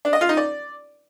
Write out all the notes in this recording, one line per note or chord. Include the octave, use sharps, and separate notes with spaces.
D4
D#5
F4
D#4
D5